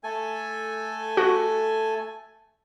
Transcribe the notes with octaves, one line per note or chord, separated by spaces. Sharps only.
A3 A4 G#5
F#4